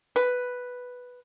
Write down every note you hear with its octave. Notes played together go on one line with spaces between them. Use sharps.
B4